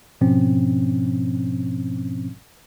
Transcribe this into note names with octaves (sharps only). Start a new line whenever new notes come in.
G#2 B2 F3 C4 C#4